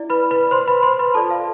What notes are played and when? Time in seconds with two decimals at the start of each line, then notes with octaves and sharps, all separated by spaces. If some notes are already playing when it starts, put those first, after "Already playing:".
Already playing: E4 D5
0.10 B4 B5
0.31 B4 B5
0.51 C5 C6
0.67 B4 B5
0.83 C5 C6
0.99 B4 B5
1.14 F4 A4 D5 A5
1.30 F5